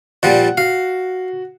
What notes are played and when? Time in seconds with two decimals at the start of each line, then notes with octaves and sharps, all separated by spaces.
0.23 A#2 F3 G3 F#5
0.57 F#4 F5